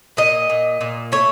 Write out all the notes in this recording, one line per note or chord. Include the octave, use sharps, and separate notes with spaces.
A#2 D#5
A#2
A#2
A3 C#5